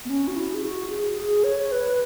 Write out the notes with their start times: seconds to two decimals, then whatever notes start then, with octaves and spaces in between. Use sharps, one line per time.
0.05 B3
0.09 C#4
0.27 F#4
0.36 E4
0.53 G#4
0.63 F#4
0.90 G#4
1.18 G#4
1.44 C#5
1.72 B4